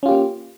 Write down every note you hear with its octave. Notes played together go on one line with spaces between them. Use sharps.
A#3 C#4 F4 G4